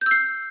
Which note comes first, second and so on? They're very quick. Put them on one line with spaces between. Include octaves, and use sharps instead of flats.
G6 E6 C7